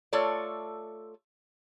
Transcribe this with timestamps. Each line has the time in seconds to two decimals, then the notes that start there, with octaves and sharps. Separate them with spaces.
0.13 A3 F4 A4 C#5 D5